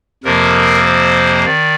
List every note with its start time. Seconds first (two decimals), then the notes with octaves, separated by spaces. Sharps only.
0.24 F2 C3 F3 A#3 A#4
0.85 C5
1.45 D#3 D5